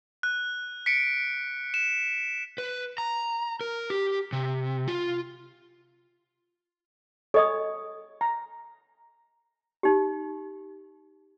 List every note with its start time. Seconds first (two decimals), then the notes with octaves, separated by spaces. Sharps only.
0.23 F#6
0.86 B6 C#7 D7
1.74 E7
2.58 B4
2.98 A#5
3.61 A#4
3.90 G4
4.33 C3
4.88 F4
7.34 A4 C#5 D#5 D#6
8.21 A#5
9.83 D#4 G4